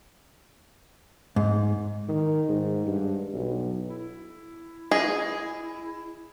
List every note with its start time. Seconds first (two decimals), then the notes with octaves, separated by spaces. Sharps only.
1.36 G#2
2.09 D#3
2.49 G#2
2.87 G2
3.34 B1
3.90 E4
4.91 G#4 D#5 G#5